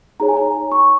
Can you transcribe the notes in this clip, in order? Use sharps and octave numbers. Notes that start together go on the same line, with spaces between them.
D#4 G#4 C#5 A#5
G#5
A#5
C#6